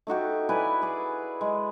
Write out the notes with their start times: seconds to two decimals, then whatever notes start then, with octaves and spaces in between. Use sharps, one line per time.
0.07 A3 D#4 F#4 G4
0.49 E4 B4 D5 G#5
0.82 G#4 D5
1.41 G#3